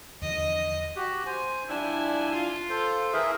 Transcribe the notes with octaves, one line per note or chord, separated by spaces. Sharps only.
E2 D3 F3 D#5
F#4 G4
C5 G#5
F3 G3 D4 E4 G#5
F4
A4 C5
E3 G#4 A#4 E5